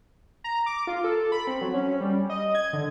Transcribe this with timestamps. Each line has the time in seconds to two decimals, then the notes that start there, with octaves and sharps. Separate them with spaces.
0.44 A#5
0.66 D6
0.87 F4
1.04 A4
1.32 B5
1.47 C4
1.61 F#3
1.74 C#4
2.01 G3
2.30 D#5
2.55 G#6
2.73 D3